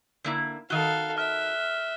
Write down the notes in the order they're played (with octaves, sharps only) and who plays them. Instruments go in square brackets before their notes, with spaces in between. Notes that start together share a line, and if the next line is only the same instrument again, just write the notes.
[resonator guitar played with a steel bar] D3 A#3 E4
[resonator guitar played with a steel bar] D#3 F#4 [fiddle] A4 F5 [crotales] F#6 G7
[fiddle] E5 [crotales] F6